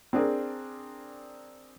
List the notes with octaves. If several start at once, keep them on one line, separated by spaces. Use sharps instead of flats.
C4 D4 G#4 A#4